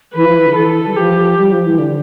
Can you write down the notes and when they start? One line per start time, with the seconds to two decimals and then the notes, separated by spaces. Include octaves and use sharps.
0.14 E3 B4
0.24 F3
0.35 E3
0.46 D3
0.55 E3 A4
0.87 G3
0.96 F3 G4
1.38 G3
1.52 F3
1.66 E3
1.79 D3